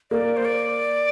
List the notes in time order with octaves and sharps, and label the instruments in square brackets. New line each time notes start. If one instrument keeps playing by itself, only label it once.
[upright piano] A#3 [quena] D5
[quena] C5
D5